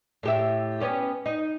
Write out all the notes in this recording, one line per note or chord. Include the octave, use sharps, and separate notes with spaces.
A2 G4 E5
B3 C#4 G4
D#4